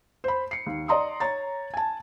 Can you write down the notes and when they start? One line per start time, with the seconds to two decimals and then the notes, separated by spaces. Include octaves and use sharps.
0.24 C5 B5
0.51 C7 C#7
0.66 D#2
0.88 D5 D#5 A#5 C6 D#6
1.20 C#5 A#5 A6
1.74 G#5 A5